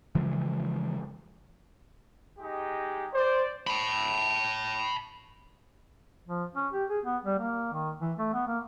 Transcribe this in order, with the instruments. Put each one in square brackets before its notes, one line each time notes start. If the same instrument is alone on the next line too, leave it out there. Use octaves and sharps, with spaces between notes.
[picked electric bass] C#3 E3 F3 G#3
[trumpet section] G#3 D#4 G4
[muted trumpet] C5 [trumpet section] D5
[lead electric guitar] A5 B5
[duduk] F3
C#4
G4
G#4
B3
G3
A#3
D#3
E3
A3
B3
A#3